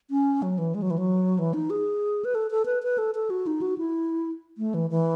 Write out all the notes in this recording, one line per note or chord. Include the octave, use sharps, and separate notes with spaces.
C#4
F#3
E3
G#3
F#3
E3
F#3
E3
D#4
G#4
B4
A4
A4
B4
B4
A4
A4
F#4
D#4
F#4
E4
A3
E3
E3